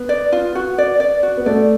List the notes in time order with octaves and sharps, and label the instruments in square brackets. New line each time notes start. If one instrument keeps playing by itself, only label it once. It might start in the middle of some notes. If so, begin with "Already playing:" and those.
Already playing: [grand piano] B3
[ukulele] D5
F4
F#4
D5
D5
F#4
[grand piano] B3
[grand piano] A3 [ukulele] D5